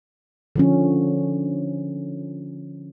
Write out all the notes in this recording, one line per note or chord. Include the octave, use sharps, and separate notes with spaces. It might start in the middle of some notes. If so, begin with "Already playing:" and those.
D3 F3 C#4